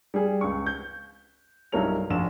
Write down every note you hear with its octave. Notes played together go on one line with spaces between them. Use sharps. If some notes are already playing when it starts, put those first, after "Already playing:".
G3 G#4
C#2 C#6
G6
B1 G2 E4 A#4 C#5 F7
F1 A#1 E7